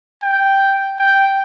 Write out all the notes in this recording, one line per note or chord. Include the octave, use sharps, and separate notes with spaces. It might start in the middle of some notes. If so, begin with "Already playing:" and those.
G5
G5